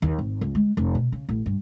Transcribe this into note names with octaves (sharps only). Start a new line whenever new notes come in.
D#2
G#1
C#2
G#3
F1
B2
C#3
A1
G2